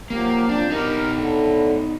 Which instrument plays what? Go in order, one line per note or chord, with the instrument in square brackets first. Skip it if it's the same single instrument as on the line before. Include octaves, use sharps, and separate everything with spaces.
[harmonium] F3 F#3 G4 [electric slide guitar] A#3
[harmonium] F2 F3 G5 [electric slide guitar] D4
[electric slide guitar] D#4 F#4 [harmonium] G4 A#4
[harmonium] A2 D3